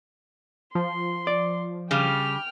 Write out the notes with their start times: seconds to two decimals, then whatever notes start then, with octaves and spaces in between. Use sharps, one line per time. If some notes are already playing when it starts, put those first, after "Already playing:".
0.75 F3 C6
1.27 D5
1.91 C#3 G3 G5 F6